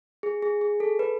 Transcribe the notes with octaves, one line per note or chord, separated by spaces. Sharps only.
G#4
G#4
G#4
A4
B4